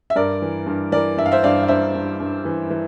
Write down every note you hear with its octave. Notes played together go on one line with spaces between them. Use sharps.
E5
G2 A#4 D5
E3
G2
E3 A#4 D5
G2 E5
F5
C5 E5
G2 D5 F5
F5
G2 C5 E5
G2
G2
E3
E3